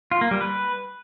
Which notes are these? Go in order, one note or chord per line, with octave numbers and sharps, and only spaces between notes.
F4
A#3
G3
B4